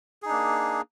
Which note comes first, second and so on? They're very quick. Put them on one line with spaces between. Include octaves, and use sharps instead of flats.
G#4 D#4 D4 A#3